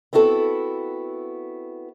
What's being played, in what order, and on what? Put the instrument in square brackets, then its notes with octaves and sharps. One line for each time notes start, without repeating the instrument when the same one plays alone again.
[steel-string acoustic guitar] B3 C4 E4 F#4 A4